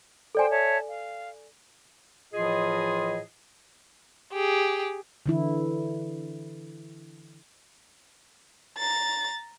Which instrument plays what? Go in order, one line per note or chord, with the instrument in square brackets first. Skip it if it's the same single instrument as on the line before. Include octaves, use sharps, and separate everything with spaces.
[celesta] A4 D5 G#5 [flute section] C5 G5
[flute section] C#5 E5 A5
F5
[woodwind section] A2 E3 F3 F4 G#4 D#5
[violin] G4 G#4
[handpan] D3 E3 E4
[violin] A#5 A6